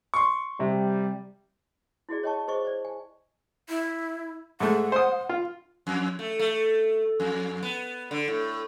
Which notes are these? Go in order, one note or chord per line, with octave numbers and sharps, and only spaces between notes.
C6 C#6
C3 G3
E4 F#4 G#4 D5
C#5 D#5 G5 A5 C#6
G#4 C5 D#5 C#6
C5 D5
G#5
E4
G#2 A3 F#5
C5 D#6
F4
F2
A3
A3
F2
B3
D3
A2